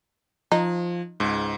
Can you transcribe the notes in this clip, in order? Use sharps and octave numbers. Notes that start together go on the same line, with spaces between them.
F3 D#4
C#2 G#2